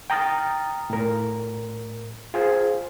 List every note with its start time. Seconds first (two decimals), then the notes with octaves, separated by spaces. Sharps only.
0.10 G5 A#5 D#6 F6 A6
0.90 A2 A#4
2.34 F4 G#4 C5